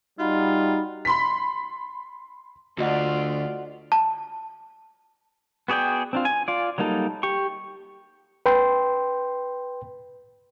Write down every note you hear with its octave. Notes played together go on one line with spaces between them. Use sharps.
G3 D#4 F4 F#4 F#5 B5
B5 C6 B6
D2 F4 F#4 D5 D#5 F#5
A5
B3 F#4 G#4 D5 G5
C4 D4 F4
G#5
F4 D5
F#3 G3 A#3 D#4 A4
G4 C#6
B4 G5 C6